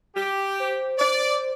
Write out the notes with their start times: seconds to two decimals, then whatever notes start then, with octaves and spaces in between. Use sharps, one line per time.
0.15 G4
0.60 C5
0.98 D5